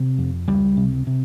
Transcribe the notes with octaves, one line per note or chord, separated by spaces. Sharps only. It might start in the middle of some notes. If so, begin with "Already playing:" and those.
Already playing: C3
F2
C#2 G3
C3
C3